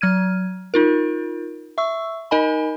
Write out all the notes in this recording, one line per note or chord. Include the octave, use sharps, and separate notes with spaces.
F#3 F6 G#6 D#7
D#4 F4 A#4
E5 C#6 E6
D#4 A#4 D#5 G#5 B5